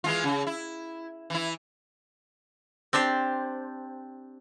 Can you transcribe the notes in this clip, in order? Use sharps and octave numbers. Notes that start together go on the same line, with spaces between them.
E3 G#3 F4
C#3
E4
E3 E4
C4 D4 G4 C5